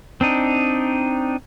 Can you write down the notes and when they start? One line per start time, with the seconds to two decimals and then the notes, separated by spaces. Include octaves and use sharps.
0.21 C4 D4 D#4